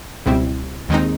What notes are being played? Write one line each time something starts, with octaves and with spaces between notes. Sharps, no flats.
C#2 B2 G3 C4 E4
D#2 D#3 G#3 C4 D#4